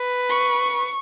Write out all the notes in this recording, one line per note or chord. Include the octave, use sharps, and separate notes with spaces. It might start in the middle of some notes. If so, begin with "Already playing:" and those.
Already playing: B4
C#6